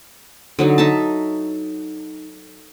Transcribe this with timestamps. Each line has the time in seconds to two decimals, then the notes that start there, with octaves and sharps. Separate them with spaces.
0.59 D3 F#3 D#4
0.78 D#4 E5 A5